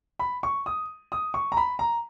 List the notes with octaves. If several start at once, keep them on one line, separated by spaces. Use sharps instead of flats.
B5
C#6
D#6
D#6
C#6
A#5
B5
A#5